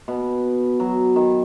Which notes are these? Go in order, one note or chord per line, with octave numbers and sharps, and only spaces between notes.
B2
F#3
D#3